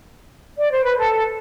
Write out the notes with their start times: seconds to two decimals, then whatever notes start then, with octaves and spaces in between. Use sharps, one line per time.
0.58 D5
0.71 C5
0.85 B4
0.98 A4